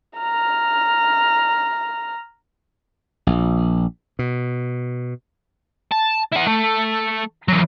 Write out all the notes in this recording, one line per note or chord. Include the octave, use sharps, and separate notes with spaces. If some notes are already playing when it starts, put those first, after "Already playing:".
A#5 F6
A#1
B2
A5
E4 F#5
A3
E3 F#3